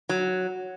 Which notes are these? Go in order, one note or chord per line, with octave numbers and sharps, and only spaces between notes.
F#3